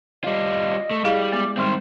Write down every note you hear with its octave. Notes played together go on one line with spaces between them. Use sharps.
G3 F4 D#5
A3
G3 E4 G#4 F5
G#3 B3 D6
D#3 G3 G#3 C4 C6